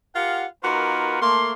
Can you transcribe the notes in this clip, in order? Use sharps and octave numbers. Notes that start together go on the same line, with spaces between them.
F4 G4 A#4 F5 F#5
A#3 D#4 F4 F#4 A#4 B4
A3 A#3 C6